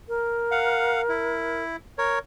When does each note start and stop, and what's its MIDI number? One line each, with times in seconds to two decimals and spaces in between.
0.08 1.63 70
0.51 1.02 77
0.51 1.02 78
1.09 1.76 64
1.98 2.19 70
1.98 2.19 73